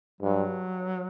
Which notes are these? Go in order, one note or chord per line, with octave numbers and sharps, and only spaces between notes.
G2 F#3